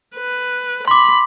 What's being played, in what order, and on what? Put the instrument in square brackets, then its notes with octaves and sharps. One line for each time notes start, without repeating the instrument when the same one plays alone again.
[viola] B4
[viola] B5 [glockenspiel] C6 D6